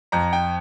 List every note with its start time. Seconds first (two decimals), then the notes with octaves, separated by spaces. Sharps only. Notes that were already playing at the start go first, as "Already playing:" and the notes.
0.12 F2 A#5
0.33 G5